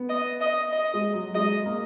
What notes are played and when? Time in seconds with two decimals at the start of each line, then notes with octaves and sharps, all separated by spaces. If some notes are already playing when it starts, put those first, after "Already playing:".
Already playing: B3
0.09 D#5
0.41 D#5
0.72 D#5
0.94 G#3
1.13 F#3
1.34 G#3 D#5
1.65 A#3